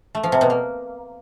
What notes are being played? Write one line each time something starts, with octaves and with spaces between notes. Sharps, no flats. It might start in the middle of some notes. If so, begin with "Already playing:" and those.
A3
F3
C3
B2
A#3